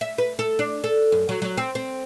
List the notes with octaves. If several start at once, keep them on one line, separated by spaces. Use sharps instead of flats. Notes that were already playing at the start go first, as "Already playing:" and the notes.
E5
B4
A4
D4
A4
F#2
F#3
F#3
C4
C4